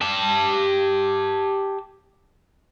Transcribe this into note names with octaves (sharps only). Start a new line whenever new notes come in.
G4 A5